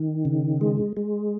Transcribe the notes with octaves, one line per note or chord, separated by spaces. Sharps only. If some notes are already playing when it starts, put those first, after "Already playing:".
Already playing: D#3
C#3
G#3
G#3